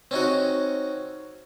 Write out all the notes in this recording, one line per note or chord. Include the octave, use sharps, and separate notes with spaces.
C4 C#4 D#4 F#4